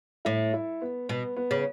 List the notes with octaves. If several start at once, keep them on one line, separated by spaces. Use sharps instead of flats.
A2 E4
E4
B3
B2 B3
B3
C#3